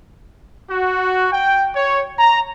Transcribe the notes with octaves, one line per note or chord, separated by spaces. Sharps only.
F#4
G5
C#5
A#5